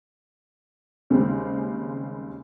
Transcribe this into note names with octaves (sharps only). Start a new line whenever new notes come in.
D#2 C#3 G3 G#3 C4 D#4